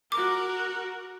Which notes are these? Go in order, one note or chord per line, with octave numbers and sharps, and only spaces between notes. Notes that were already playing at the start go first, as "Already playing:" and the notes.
F#4 A#4 D6